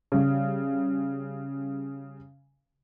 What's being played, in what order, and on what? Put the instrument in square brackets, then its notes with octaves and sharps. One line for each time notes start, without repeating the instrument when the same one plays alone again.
[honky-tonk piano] C#3 G3